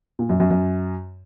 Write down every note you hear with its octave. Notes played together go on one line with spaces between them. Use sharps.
A#2
F#2
F#2
F#2